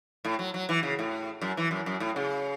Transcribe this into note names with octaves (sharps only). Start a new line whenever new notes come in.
A2
F#3
F#3
E3
C#3
A2
F#2
E3
F#2
F#2
A2
C#3